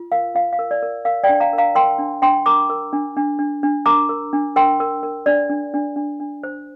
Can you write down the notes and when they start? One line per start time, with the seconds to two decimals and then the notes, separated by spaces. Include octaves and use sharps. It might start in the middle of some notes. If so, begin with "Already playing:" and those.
Already playing: F4
0.12 A#4 F5
0.35 F4 F5
0.53 F5
0.59 A#4
0.71 D5
0.82 A#4
1.05 A#4 F5
1.24 D5 G5
1.29 D4
1.40 F5 A#5
1.53 A#4
1.58 F5 A#5
1.75 A#4 G5 C6
1.99 D4
2.22 D4 G5 C6
2.46 A#4 A#5 D6
2.70 A#4
2.93 D4
3.17 D4
3.39 D4
3.63 D4
3.86 A#4 A#5 D6
4.09 A#4
4.33 D4
4.56 A#4 G5 C6
4.80 A#4
5.03 A#4
5.26 D4 D5
5.50 D4
5.74 D4
5.96 D4
6.20 D4
6.43 C5